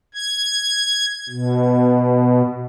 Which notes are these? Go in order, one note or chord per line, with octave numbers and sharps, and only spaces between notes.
G#6
B2